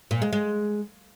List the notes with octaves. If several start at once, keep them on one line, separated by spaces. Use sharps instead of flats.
A#2
G#3
G#3